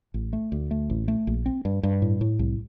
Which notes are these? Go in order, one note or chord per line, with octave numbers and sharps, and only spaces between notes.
A1
A3
D2
A3
A1
A3
A#1
C4
G2
G2
A2
A2
C2